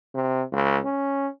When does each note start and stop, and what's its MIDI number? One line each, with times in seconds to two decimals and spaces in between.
0.14 0.42 48
0.52 0.78 37
0.85 1.28 61